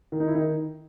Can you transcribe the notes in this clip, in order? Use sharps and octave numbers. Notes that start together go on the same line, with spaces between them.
D#3
D#4
E4
D#3 D#4